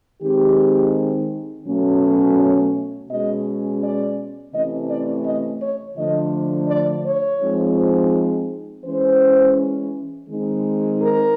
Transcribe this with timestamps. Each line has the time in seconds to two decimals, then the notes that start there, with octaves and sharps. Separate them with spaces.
0.22 D#3 G#3 C4 D#4 G4
1.67 B2 F#3 A3 C#4
2.38 C#5
3.09 B2 G#3 C#4 D#5
3.82 D5
4.54 C3 E3 A3 C#4 D#5
4.89 D5
5.26 D#5
5.61 C#5
5.97 D3 F3 A3 D4 D#5
6.69 D5
7.04 C#5
7.41 F3 G#3 C4 D#4
8.84 E3 G#3 C#4 C5
10.28 D#3 G#3 C4 D#4
11.00 A#4